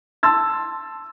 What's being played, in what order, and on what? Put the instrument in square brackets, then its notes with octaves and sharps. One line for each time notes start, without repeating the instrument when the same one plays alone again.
[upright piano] A5 C6 E6 A6